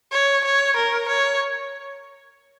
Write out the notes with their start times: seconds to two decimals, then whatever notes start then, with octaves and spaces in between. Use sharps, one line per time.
0.12 C#5
0.45 C#5
0.76 A#4
1.09 C#5